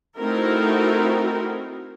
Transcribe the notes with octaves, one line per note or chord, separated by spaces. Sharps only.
A3 C4 D#4 E4 F#4 A#4